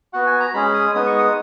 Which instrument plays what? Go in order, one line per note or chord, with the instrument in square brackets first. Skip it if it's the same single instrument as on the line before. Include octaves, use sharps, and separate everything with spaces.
[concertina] B3 F#4 F#5
G#5
A#5
G#3 C#4 G#4 B5
D#6
G#3 B3 D#4 D#6
C#6
D#6